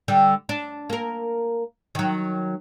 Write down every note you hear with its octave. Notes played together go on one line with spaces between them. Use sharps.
D3 G3
D4
A#3 A#4
D#3 F#3